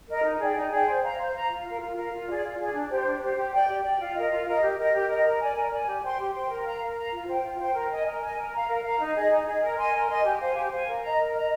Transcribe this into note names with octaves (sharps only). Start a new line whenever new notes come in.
A#4 D#5
D#4
G#4 D5 G5
D#4
G#4 D5 G5
C5
F5 A#5
C5
F5 A#5
F4
A#4 F5
F4
A#4 F5
F4
G#4 D5
F4
G#4 D5
D4
G4 C5
D4
G4 C5
G4
D5 G5
G4
D5 G5
F4
A#4 D#5
F4
A#4 D#5
G4
A#4 D#5
G4
A#4 D#5
A#4
D5 G#5
A#4
D5 G#5
G4
C5 G5 C6
G4
C5 G5 C6
A#4
F5 A#5
A#4
F5 A#5
F4
C5 G5
F4
C5 G5
A#4
D#5 G#5
A#4
D#5 G#5
A#4
F5 A#5
A#4
F5 A#5
D#4
G#4 D#5
D#4
G#4 D#5
A#4
D#5 G#5 C6
A#4
D#5 G#5 C6
G4
C5 F5 G#5
G4
C5 F5 G#5
A#4
D#5 A#5
A#4
D#5 A#5